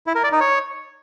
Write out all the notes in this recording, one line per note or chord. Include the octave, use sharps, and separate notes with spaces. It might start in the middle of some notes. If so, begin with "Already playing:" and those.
E4
A#4
D5
D#4
C#5